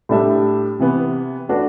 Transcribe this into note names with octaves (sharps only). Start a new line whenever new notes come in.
A2 G3 D4 A4 E5
C3 E3 B3
A3 D4 F#4 B4 D5